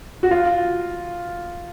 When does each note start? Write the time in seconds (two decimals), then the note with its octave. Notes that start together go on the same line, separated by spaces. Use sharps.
0.23 F#4
0.31 F4